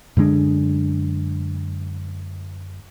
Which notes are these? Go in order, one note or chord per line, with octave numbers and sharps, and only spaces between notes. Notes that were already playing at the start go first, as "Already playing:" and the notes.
F#2 D3 G#3 D4